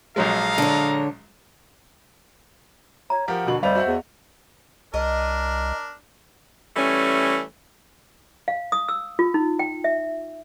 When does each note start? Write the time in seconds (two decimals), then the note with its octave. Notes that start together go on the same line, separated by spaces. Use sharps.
0.16 A#1 F#3 G#3 A4 D#5 F5 A#5
0.58 D3 C#5
3.10 C#5 A#5
3.28 F3 G4 A#4 F#5
3.47 D#2 B2 D3 F#7
3.63 F1 G3 C5 D#5 F5 F7
3.75 F#4 E5 F#5
3.87 E2
4.94 C2 D4 A#4 D#5
6.76 E3 G3 A3 C#4
8.48 F5
8.72 D#6
8.89 E6
9.19 F4
9.34 D#4
9.59 G5
9.84 E5